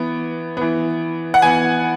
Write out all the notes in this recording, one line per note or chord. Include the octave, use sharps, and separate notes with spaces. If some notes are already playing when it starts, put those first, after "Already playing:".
Already playing: E3 B3
E3 B3
F#5
E3 B3 G#5